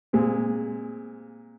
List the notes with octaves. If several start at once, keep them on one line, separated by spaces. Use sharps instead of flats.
A#2 G#3 C4